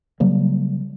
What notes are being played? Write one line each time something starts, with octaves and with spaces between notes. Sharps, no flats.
C#3 F#3 G3 A#3